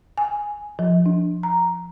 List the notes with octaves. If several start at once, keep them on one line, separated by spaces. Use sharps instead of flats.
G#5
F3
D4
A#5